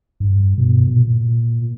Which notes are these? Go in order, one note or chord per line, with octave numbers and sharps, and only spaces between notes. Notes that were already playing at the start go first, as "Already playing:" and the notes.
G2
B2
B2
A#2